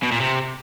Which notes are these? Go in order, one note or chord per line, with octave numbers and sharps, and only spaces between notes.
B2
A#2
C3